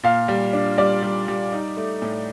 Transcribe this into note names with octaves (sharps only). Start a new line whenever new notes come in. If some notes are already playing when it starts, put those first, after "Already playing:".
A#2 F5
G3
D4
G3 D5
G3
G3
D#4
A3
A2